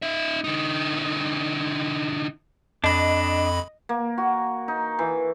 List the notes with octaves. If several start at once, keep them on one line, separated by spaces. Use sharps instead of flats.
D#4 E5
D3 D#4
F2 D4 D#5 B5
A#3
F#4
D#4
E3